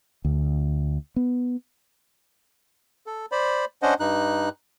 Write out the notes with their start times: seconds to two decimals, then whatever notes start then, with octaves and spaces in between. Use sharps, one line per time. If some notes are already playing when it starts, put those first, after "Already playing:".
0.25 D2
1.16 B3
3.06 A4
3.32 C5 D5 B5
3.82 C#4 D4 C5 D#5 F#5
4.00 G2 D#4 F#6